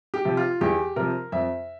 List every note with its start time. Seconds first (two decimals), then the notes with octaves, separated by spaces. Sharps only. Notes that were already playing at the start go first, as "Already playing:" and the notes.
0.14 G4
0.25 C3 F3
0.37 F4
0.61 E2 G4
0.96 C3 F3 A#4
1.32 F2 E5